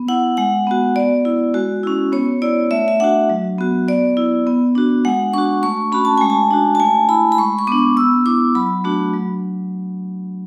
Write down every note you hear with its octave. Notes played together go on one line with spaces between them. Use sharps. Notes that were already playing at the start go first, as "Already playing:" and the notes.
Already playing: B3
E4 F#5
G#3 F#5
B3 F#4
B3 D5
E4
G#3 F#4
C#4 E4
B3 C#5
E4 D5
A3 E5
E5
D4 F#4 F#5
F#3
B3 F#4
B3 D5
E4
B3
D4 F#4
G#3 F#5
D4 F#4 C#6
A3 C#6
C#4 F#4 B5
A5
G#3 G#5
A5
D4 F#4
A5
A3 G#5
E4 B5
B5
G#3 C#6
C#6
B3 D4 D6
B3 E6
E4 D6
F#3 B5
A3 D4 F#4
F#3